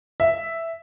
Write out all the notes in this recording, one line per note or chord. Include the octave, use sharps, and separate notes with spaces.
E5